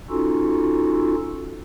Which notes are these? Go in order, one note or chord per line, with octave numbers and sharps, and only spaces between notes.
C#4 D#4 F4 F#4 A4